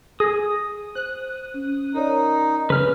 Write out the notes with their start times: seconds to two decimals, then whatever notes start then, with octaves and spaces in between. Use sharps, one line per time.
0.20 G#4 D#6 A#6
0.95 C5 F#6
1.54 C#4
1.94 D#4 A#4 C#5 D5
2.70 C#3 B4 F6